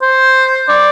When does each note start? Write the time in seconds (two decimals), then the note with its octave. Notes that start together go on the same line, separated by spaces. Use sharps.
0.02 C5
0.69 D5